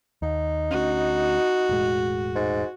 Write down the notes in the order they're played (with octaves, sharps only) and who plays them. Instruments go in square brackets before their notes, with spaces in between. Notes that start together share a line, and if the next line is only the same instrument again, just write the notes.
[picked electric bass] D#2 [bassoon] D#4
[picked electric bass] D2 C#4 [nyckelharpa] F#4
[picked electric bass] E1 A2 G#3
[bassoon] G#2